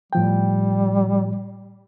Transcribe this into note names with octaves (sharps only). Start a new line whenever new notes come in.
A2 F3 G3 G5